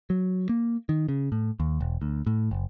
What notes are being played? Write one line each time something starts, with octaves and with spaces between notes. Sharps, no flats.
F#3
A#3
D#3
C#3
A2
D#2
E1
D2
A2
F#1